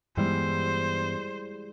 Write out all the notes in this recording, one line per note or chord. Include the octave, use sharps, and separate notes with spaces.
G2 E3 G3 G#3 B3 E4 C5